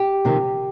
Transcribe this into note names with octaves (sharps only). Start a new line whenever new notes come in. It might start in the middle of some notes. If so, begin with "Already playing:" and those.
Already playing: G4
F2 C3 D#3